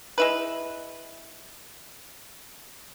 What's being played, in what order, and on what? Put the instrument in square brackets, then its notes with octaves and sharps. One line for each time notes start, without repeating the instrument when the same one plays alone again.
[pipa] G#3 E4 B4